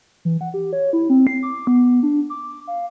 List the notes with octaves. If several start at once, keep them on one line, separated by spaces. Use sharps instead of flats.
E3
F#5
G4
C#5
E4
C4
C7
D6
B3
D4
D6
F5